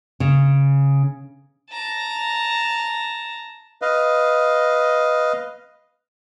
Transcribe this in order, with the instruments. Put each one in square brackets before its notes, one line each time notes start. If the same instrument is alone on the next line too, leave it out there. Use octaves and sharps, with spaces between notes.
[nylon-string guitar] C#3
[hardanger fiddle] A5 A#5
[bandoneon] B4 D#5 F5